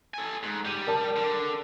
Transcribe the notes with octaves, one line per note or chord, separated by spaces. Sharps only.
A4 G#5
G#2
G3 G6 D#7
A#4 D5 A5
D3